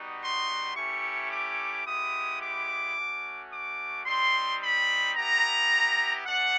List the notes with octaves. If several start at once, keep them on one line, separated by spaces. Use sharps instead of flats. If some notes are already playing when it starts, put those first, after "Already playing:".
Already playing: G3 B3 D#4 F#4
C6
A3 C#4 E4 G4 C#6
D6
G#3 B3 E4 G4 D#6
D6
A3 C#4 F#4
D6
G3 C4 D#4 C6
B5
B3 E4 G4 A#5
A3 D4 F#5